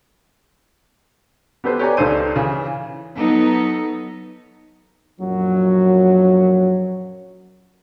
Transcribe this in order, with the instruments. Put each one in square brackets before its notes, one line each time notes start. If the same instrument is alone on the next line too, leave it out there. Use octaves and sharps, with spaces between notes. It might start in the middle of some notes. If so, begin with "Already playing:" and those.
[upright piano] B3 G4 A4 B4 C5
G4 B4 C#5 D5 G#5 A#5
C#2 D4 D#4 A4 C5 D#7
C#3 E3
[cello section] F#3 B3 D#4 A4
[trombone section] A#1 F#2 F#3